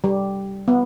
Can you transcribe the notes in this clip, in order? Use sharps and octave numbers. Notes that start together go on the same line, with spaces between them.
G3
B3